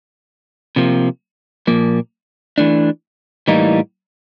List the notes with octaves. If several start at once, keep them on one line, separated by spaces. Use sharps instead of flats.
C3 F3 A#3
A#2 F3 A#3
E3 A3 D4
A2 E3 G3 A#3 D#4